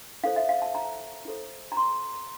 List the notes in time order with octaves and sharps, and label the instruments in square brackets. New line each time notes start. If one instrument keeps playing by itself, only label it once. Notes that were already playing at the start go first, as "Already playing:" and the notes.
[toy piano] E4 A4 C5 F5
E5
F5
A5
A#5
E4 A4 C5
A#5
C6